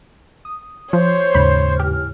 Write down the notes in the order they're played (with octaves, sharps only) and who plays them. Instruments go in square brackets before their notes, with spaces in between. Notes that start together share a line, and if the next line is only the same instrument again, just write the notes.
[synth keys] D#6
[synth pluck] F3 [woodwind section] C5 [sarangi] C#5
[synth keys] D#2 G#2 C#3 [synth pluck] B5
[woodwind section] A2 E3 F6 [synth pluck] G4